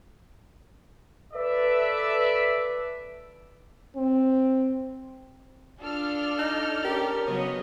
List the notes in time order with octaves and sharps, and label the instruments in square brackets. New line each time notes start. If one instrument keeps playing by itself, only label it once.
[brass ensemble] A4 B4 D5 E5
[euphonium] C4
[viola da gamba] D4 F4 [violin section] A4 D5 F6
[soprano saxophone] D#4
[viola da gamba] C#4 [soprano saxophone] G4 [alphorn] A#4
[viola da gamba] C#3 F#3 B3 [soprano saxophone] C#5 [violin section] D#5